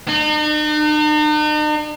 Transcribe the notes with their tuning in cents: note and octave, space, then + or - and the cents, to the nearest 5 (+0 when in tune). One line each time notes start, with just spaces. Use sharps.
D#4 -45